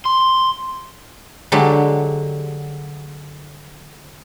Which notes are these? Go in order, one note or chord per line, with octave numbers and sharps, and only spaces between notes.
C6
D3 F#3 G#3 G4